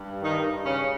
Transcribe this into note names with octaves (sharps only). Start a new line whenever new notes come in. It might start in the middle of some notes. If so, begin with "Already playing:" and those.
Already playing: G2
D#3 D#4
C#3 C#4